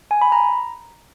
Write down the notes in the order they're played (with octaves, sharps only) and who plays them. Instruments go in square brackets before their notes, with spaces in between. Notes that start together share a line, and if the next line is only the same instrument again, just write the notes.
[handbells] G#5
B5
A#5